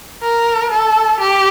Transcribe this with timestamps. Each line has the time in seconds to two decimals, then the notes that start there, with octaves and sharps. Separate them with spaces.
0.22 A#4
0.71 A4
1.20 G4